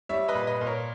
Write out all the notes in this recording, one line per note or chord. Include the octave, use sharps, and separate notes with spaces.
G3 C#5 E5
B4 D#5
A#2
B4 D#5
A#2
A#4 C#5